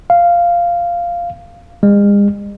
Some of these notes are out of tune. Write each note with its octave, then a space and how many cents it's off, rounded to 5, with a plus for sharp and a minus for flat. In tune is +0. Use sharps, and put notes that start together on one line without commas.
F5 -10
G#3 -40